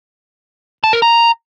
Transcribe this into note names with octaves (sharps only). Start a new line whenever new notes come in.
A5
A#4
A#5